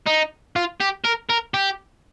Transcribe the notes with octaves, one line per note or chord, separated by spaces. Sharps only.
D#4
F4
G4
A#4
A#4
G4